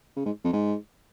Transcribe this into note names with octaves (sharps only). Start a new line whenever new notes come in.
C#3
G#2
F2
G#2